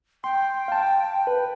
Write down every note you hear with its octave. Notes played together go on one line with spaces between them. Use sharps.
G5 C6
F5 A5
B4